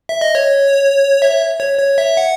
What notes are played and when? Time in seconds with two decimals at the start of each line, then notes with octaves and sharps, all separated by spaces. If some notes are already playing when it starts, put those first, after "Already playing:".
0.09 E5
0.21 D#5
0.35 C#5
1.22 E5
1.60 C#5
1.79 C#5
1.98 E5
2.17 F#5